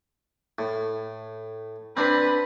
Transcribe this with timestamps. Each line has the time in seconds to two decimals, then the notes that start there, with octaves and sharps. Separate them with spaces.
0.59 A2
1.97 C4 D4 B4